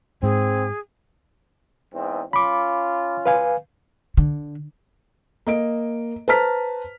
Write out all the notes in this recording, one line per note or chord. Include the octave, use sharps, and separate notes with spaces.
G#2 C4 G#4
E2 G#2 C4
C#4 F4 B5 D6
B4 F5 G#5
D3
A#3 D#5 D7
B4 C5 A5 A#5 F6 B6